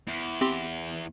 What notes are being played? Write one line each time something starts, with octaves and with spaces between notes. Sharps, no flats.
E2
C4 G4 C6